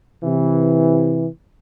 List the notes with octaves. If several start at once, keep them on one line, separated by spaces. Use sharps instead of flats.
C3 E3